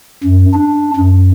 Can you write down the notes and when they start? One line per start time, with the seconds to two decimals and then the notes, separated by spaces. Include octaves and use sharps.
0.23 F#2
0.53 D4
0.96 F#2